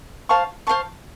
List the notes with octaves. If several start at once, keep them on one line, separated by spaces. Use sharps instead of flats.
C5 F5 A5 C#6
C5 F5 A5 C#6